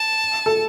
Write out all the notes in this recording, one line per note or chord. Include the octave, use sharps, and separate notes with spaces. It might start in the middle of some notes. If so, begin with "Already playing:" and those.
Already playing: A5
A4